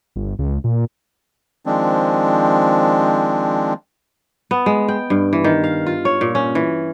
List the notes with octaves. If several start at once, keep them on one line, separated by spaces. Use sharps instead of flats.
G1
C#2
A#2
D#3 F3 G#3 C4 D4
B3
G#3
G5
G2
E3
D#3
F5
F4
C#5
A#2
C#4
E3